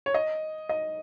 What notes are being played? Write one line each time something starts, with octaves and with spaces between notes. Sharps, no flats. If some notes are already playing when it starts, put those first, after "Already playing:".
C#5
D#5
D#5